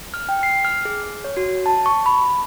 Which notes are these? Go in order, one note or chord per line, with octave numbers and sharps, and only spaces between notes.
F6
G5
C7
F6
G#4
C#5
F#4
A5
C#6
B5